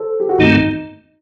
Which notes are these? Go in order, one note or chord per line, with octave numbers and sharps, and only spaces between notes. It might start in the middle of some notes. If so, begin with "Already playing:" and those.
Already playing: A4 C5
G4
F#4
G2 D#3 A3 C4 D#4